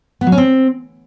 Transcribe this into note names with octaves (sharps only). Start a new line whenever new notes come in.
B3
F#3
C#4
C4